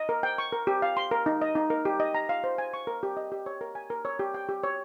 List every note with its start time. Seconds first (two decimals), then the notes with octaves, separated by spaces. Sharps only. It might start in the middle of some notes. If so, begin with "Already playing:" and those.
Already playing: D#5
0.09 A#4
0.23 G5
0.38 C#6
0.52 A#4
0.67 G4
0.82 F5
0.97 C6
1.11 A#4
1.26 D#4
1.41 D#5
1.55 D#4
1.70 A#4
1.85 G4
2.00 D#5
2.14 A#5
2.29 F5
2.44 C5
2.58 G#5
2.74 C#6
2.87 A#4
3.03 G4
3.17 D#5
3.32 G4
3.46 C#5
3.61 A#4
3.75 G#5
3.90 A#4
4.05 C#5
4.19 G4
4.34 G5
4.49 G4
4.64 C#5